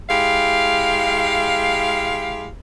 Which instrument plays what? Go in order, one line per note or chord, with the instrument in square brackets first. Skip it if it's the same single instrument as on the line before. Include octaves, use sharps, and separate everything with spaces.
[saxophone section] G#3 E4 G4 F5